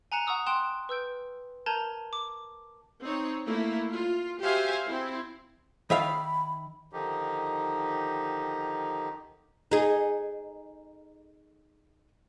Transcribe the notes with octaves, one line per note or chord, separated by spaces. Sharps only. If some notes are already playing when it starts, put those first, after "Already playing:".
G#5 A#5 F#6 C#7 E7
F#5 A#5 C#6 D#6 E6 F#6
G5 C6 D#6 F#6 D7 E7
B4 E6 G6 D7
A#4 A5 A#5 G6 G#6 D#7
D6
C4 D#4 C#5
A3 A#3 E4
F4
F#4 G4 C5 E5 F5 G#5
C4 E4
D#3 E5 F5 B5
D3 D#3 F3 D#4 G4
D#4 G#4